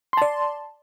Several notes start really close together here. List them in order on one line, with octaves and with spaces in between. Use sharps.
C6 A5 D5